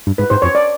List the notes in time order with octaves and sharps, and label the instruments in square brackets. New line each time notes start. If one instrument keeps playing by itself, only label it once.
[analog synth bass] G2
[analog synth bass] G#2 [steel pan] B4
[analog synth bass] G#2 [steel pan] C5
[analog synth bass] F2 [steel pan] C#5
[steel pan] D5